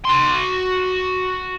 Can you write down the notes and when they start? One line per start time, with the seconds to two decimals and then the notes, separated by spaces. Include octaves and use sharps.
0.05 F#4 C6